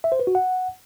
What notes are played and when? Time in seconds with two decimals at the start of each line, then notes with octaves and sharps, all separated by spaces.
0.04 E5
0.12 C5
0.20 B4
0.27 F#4
0.35 F#5